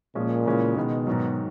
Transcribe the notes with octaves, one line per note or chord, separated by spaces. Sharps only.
A#2 F3 G#3 C#4
C#3 E3 G#3 C#4
B2 D#3 G#3 B3
G#2 D#3 F#3